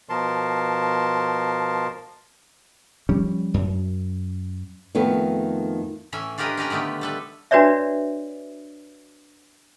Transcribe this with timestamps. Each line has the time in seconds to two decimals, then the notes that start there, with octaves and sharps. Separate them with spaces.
0.09 B2 F3 A#4 A5 C6
3.09 F3 G3 C#4
3.54 F#2
4.95 F2 D#3 A3 B3
6.12 A2 E3 C#4 E5
6.38 D4 F4 G4 A#4 B4 D#5
6.57 C#4 G4 A#4 B4
6.70 D3 D#3 A3 B3 G4
7.01 G3 A4 B4
7.51 D4 F#4 B4 C#5 D5 E5